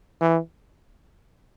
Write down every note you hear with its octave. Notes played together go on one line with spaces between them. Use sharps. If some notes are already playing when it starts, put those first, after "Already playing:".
E3